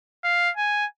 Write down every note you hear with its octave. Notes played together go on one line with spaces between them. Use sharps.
F5
G#5